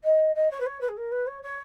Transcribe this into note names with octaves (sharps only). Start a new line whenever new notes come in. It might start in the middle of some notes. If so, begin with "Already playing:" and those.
D#5
D#5
C#5
B4
C#5
B4
G#4
A#4
B4
C#5
C#5